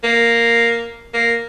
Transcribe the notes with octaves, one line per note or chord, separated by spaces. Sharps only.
A#3
A#3